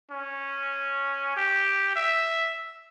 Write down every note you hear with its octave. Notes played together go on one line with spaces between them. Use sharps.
C#4
G4
E5